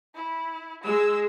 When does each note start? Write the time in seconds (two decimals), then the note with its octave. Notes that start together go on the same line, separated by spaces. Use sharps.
0.15 E4
0.84 G#3 E6